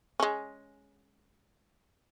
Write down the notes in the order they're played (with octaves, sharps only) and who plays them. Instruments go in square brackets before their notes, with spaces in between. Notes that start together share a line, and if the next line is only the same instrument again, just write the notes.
[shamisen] G#3 C#4